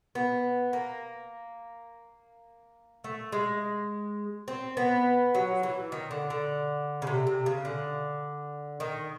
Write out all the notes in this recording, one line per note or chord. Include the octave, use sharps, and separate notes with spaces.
B3
A#3
A3
G#3
C4
B3
F#3
E3
D#3
D3
D3
C#3
C3
C3
C#3
D3
D#3